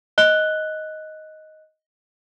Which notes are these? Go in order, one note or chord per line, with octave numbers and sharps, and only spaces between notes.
D#5 F#6 G7